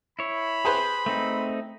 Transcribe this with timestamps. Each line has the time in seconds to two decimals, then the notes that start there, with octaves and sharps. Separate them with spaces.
0.19 E4 C#5 B5
0.65 G#4 B4 C5
1.06 A3 C4 D#4